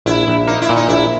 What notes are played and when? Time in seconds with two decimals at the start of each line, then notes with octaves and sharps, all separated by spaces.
0.06 A#1 E4
0.28 A#1
0.47 A#3 D#4
0.62 E4
0.69 A#2
0.76 D#4
0.89 A#1 E4